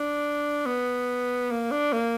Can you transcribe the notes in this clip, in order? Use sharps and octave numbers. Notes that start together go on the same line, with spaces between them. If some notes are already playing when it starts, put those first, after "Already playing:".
Already playing: D4
B3
A#3
D4
A#3